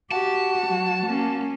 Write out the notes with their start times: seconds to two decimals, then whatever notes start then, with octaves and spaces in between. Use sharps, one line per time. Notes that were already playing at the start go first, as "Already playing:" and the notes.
0.12 F#4 G4 A5
0.67 F#3
1.06 A#3 C#4